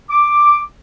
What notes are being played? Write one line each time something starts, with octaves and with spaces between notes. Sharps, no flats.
D6